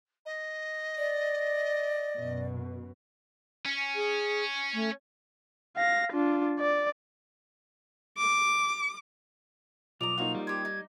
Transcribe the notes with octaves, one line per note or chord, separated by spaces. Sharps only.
D#5
D5
F#2 B2
C#4
G#4
A3
F5 A#6
D4 F4
D5
D6
B1 F3 D5 D#5 A#5 F7
F3 A#3 D#4 F4 F#4
G3
G4 C5 G#6
D#4